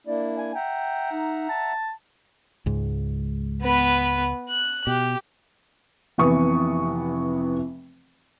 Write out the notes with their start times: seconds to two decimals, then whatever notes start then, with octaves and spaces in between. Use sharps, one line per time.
0.07 A#3 D4 E4 D5
0.38 G#5
0.55 E5 F#5 G5 A#5
1.12 D#4
1.49 A5
2.66 C#2 G#2
3.62 B3 B4
4.49 F#6
4.87 B2 G4
6.18 F1 C3 E3 B3 C#6 D#6